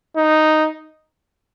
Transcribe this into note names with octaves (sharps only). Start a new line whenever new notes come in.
D#4